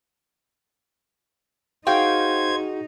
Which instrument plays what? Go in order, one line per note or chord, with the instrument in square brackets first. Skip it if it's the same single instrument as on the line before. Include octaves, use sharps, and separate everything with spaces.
[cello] D#4 [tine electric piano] F#4 G#4 [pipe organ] C5 G#6 [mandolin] F5 G5